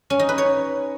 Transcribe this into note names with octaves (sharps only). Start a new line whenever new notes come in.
C#4
D#4
B4
C#5